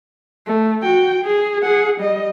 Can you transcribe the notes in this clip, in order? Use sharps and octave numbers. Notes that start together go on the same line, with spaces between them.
A3
F#4 G5
G#4
G#4 F#5
G3 D#5